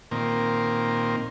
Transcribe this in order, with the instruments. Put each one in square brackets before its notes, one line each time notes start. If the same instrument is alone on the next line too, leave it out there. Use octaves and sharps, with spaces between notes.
[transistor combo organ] A#2 D#3 A#3 C4